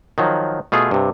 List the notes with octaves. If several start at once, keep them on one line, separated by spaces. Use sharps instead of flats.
D#3 F3 F#3
B2 A3 F4 G#4
G2 C3